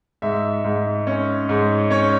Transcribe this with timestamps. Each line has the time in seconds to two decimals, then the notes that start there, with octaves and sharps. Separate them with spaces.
0.22 G#2 E5
0.64 G#2
1.07 C#4
1.49 G#2
1.90 C#4 C#5